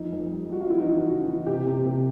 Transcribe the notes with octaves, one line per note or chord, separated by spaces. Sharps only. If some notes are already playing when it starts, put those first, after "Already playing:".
Already playing: F2 D#4
F2
G3
G3 F#4
F4
E3 E4
D#4
E3 E4
F#4
C#3
E3
C3 G4
C3
C3